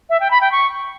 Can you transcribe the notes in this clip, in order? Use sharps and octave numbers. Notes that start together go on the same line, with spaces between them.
E5
G5
B5
G5
C#6